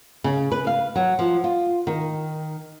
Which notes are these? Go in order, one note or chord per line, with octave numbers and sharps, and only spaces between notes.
C#3
B4
F5
F#3
F3
F4
D#3